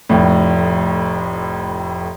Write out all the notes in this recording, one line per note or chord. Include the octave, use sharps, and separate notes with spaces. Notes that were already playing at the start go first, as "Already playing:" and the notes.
F1 F2 A2